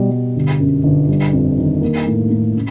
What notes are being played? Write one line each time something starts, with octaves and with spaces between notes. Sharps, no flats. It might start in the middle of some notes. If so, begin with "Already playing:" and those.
Already playing: B2 G3
G3
G1
F#2
G1
G3
F2
D#3
A#3
A2
A2
C#3